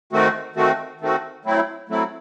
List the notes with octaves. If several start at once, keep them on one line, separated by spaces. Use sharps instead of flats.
D#3 A3 C4 F#4
D#3 A3 C4 F#4
D#3 A3 C4 F#4
F#3 A3 C4 E4
F#3 A3 C4 E4